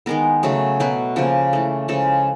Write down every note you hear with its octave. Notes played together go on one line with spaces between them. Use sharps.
D#3 G#3 B3 A#4
C#3 F#3 A3
B2 F#3 A3 B4
C#3 F3 A#3
E3 A3
C#3 F3 G#3 A4